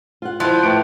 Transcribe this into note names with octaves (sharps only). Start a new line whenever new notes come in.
F4 F#5
F3 E4 C5 C6 F#6
A2 A3 B4 A5 D7